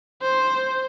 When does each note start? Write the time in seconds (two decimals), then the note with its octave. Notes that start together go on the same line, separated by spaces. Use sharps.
0.22 C5